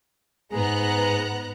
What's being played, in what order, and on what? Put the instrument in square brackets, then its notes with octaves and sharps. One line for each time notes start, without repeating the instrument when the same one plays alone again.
[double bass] G#2 [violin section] B3 A#5 F#6 [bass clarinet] G#4